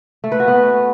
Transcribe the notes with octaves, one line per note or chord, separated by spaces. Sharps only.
A3
B4
F#4
B3